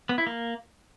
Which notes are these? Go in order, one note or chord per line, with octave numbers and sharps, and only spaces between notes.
B3
E4
A#3